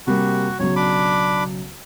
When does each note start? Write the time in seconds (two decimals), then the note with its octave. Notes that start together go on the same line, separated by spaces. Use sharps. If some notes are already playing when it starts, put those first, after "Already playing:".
0.07 C3 G3 A#3 F#4
0.60 B1 C#3 F#3 C#5
0.76 D4 B5 D6